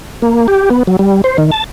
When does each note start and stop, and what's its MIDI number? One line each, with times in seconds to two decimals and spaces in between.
0.22 0.47 58
0.48 0.69 67
0.70 0.83 59
0.87 0.97 54
0.99 1.22 55
1.24 1.37 72
1.38 1.51 51
1.52 1.64 81